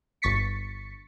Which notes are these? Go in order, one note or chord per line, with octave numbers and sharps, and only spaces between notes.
G1 C#6 A6 B6 C#7